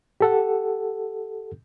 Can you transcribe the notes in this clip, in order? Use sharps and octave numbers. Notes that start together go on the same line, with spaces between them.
G4 A4 F#5